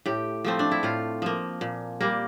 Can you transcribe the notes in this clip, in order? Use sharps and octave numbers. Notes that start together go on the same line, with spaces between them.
A2 G4
F3 A3 C4
D4
E4
A2 F4
F3 A#3
A#2
G3 A#3